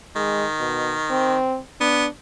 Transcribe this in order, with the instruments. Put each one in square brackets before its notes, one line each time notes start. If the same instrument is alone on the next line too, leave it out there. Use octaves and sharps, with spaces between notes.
[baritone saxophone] D#3 [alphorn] G#3
[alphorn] B2
C4
[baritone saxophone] B3 [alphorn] D4